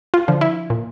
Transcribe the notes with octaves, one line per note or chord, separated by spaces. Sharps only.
F4
D3 F3
E4
A#2